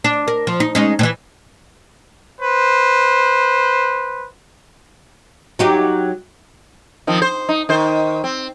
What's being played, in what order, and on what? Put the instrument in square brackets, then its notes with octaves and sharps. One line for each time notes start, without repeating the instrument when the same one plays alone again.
[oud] D4
A#4
F3
D#4
G#3 C#4 D#4
A2 E3
[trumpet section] B4 C5
[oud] F#3 D#4 G4
[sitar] D#3 F3 C4
C5
D#4
D#3 C5
C4